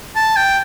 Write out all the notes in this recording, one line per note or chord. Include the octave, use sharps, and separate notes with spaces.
A5
G5